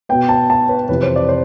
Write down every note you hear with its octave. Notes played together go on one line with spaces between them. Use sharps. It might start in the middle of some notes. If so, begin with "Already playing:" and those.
B2 B3 G5
A5
A5
B4
F2 C3 E3 B4
C5
D5
C5